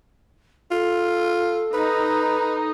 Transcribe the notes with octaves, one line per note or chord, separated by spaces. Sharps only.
F4 A4
D#4 B4